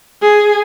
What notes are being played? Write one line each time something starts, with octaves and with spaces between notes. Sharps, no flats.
G#4